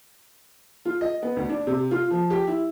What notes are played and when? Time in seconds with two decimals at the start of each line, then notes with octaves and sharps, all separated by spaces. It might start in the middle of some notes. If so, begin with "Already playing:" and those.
0.85 F4
1.01 D#5
1.23 B3
1.37 D2
1.49 D4
1.67 C3
1.91 F4
2.11 F3
2.30 G4
2.47 E4